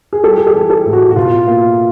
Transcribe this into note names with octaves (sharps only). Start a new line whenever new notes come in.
G#4
G3 G4 A4
G#4
G4 A4
E3
G4 A4
A2
F#4
F#4
B2 F4
A#3 F4